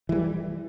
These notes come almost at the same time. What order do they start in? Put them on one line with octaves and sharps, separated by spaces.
E3 G#3 G3